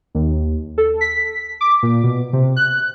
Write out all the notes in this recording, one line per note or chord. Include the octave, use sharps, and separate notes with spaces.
D#2
A4
B6
D6
A#2
B2
C3
F#6